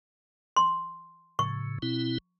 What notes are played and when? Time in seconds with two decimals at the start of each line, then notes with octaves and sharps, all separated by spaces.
0.57 C6
1.39 A2 C#3 C#6
1.82 B2 C4 E4